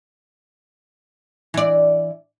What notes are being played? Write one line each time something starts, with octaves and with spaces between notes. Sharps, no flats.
E3 D5